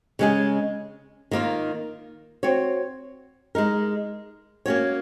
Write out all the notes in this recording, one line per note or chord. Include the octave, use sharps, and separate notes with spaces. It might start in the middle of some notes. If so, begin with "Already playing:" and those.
C#3 G#3 C#4 G#4
D#3 A#3 F4
C4 F#4 C#5
G#3 D#4 A#4
A#3 C#4 F#4 C#5